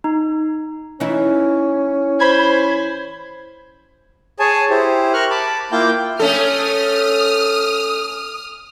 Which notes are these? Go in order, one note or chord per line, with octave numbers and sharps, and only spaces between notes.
D#4
E3 C#4 D#4 E4
C5 B5 G#6
G#4 C#5 G#5 A5
E4 G4 C5
A#4 C#6 F6 F#6
A5 B5 D6
A#3 E4 F4 G5 D6 G6
A3 C#4 A4 D#6 F6